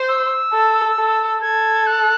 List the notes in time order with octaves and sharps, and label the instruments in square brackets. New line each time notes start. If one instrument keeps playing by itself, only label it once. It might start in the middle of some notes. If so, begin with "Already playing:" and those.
Already playing: [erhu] C5
[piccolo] E6
[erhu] A4
A4
[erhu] A4 [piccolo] G#6
[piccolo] F#6